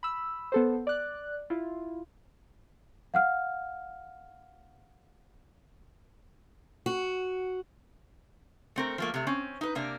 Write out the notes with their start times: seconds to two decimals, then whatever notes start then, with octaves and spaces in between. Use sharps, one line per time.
0.03 B5 E6
0.52 B3 A4 C5
0.87 D5 F#6
1.50 E4 F4
3.14 F5 F#5 F6
6.86 F#4
8.76 A3 C4 A#4
8.98 F3 A3 A#3
9.14 C3 A3
9.27 C4 C#4
9.61 D#4 B4
9.75 C3 A#3 D4